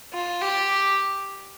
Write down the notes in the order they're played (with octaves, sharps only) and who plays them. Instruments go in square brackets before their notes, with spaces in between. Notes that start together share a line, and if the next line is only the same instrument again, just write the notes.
[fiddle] F4
G4